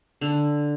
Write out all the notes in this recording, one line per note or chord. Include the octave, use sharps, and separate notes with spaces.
D3